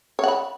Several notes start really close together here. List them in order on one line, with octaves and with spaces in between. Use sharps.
C#5 F#5 B5